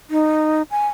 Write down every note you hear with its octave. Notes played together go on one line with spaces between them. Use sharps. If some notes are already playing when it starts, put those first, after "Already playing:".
D#4
G#5